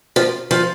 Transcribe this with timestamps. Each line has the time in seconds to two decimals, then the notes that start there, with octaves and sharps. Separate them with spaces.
0.16 F3
0.51 F3